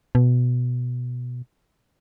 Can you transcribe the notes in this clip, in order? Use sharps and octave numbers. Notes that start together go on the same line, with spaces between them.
B2